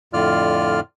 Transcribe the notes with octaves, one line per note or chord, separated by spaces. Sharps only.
F2 A2 D3 F4 D5 F6